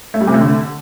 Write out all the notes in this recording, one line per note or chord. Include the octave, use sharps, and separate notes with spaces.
A3
G3
C3
A3
D3